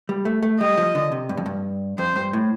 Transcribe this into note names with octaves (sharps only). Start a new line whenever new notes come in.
G3
A3
A3
G3 D#5
F3
D3
C3
G2
F2
G2
F2 C5
G2
A2